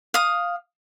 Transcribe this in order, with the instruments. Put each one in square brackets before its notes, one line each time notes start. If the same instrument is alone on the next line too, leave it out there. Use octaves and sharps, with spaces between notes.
[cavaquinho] F5 D#6